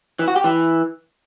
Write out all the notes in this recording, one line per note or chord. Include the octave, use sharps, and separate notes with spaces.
E3
F#4
G4
E3